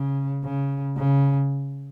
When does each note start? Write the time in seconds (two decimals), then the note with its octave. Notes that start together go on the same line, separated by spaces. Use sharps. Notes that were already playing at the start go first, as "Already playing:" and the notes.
Already playing: C#3
0.44 C#3
0.97 C#3